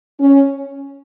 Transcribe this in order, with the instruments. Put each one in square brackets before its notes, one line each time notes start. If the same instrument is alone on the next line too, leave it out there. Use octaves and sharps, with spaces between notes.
[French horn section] C#4